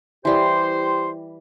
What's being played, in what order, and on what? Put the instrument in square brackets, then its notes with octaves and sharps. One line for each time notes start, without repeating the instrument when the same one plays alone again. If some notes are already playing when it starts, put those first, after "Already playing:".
[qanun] E3 G3 [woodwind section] G4 C5 C6